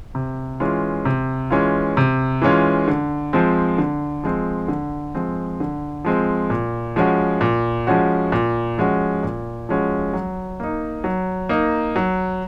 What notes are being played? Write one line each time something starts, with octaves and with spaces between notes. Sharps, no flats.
C3
E3 G#3 C#4 F4
C3
E3 G#3 C#4 F4
C3
E3 G#3 C#4 F4
D3
F3 G#3 C4
D3
F3 G#3 C4
D3
F3 G#3 C4
D3
F3 G#3 C4
A#2
F3 G#3 C#4 F#4
A#2
F3 G#3 C#4 F#4
A#2
F3 G#3 C#4 F#4
A#2
F3 G#3 C#4 F#4
F#3
A#3 D#4
F#3
A#3 D#4
F#3